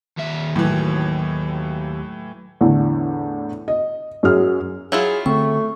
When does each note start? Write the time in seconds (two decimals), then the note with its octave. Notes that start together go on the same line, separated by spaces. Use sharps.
0.17 D#2 E5
0.56 A2 E3 F#3
2.61 E2 A2 D3
3.68 D#5
4.23 F#2 F#4 G#4 F6
4.92 F#3 E4 F4 G#4
5.26 D3 A3 C4 C#6